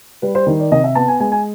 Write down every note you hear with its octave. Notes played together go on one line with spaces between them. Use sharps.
G3 B4
C5
D#3
D5
C3 D#5
E5
B3 A5
G#5
G#3 G#5
G#5